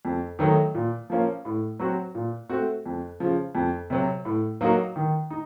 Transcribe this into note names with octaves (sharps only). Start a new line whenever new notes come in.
F2
D#3 F#3 A3 D#4
A#2
F3 A#3 C#4
A2
F#3 C4 F#4
A#2
A3 C4 F#4
F2
C#3 F3
F2
C3 F#3
A2
F#3 A#3 D#4 F#4
D#3
D#4